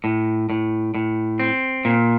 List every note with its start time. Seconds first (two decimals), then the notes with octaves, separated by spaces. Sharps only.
0.04 A2
0.50 A2
0.94 A2
1.39 C4
1.85 A#2